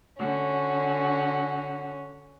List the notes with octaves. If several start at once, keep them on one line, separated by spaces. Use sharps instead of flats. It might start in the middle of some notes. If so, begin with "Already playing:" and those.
D3 C#4 F#4